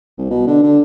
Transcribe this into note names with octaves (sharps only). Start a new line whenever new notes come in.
C2
B2
D3
D3